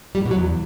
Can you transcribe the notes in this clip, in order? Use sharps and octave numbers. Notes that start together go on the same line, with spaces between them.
G3
A2
B2
F#3
E2